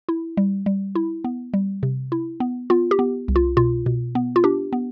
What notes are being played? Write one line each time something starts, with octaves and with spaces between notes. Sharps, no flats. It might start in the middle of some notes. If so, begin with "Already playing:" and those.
E4
G3
G3
E4
B3
G3
C3
E4
B3
B3 F4
G4
B3
C2
F4
B2 F4
B2
B3
F4
D4 G4
B3